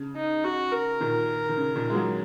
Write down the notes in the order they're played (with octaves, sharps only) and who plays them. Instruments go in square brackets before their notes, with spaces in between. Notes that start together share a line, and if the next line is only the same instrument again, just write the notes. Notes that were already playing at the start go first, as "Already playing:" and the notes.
Already playing: [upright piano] C#3
[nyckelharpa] D#4
F#4
A#4
[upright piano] A#2 D#3
D#3
C#3
A#2 D#3
G#3
F#3 A#3